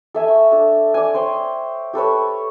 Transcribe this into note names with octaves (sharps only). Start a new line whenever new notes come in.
A4 E5 G#5
C#6
D4 A4
D5 G#5
C5 C#5 G5
G4 A4 B4 C#5